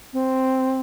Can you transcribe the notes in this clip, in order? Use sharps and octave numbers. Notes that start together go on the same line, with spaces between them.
C4